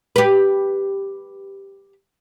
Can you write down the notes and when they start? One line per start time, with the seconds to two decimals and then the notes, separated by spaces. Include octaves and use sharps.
0.16 G4 B4